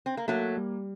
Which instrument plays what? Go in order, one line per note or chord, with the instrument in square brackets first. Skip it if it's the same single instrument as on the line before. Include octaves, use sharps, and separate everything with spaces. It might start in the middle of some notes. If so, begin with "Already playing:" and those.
[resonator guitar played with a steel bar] C4
A#3
[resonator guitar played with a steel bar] F#3 A3 [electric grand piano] A#3
[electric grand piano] G3